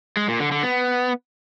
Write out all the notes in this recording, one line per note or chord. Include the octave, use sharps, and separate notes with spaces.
G#3
A#2
D3
D3
B3